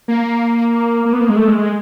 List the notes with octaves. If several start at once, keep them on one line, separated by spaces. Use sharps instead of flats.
A#3
A#3
B3
A#3
G#3
A3
G#3
G#3